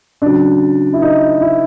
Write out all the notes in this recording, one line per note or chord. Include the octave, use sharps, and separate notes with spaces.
C#3 F#3 D4
E4
D#4
E4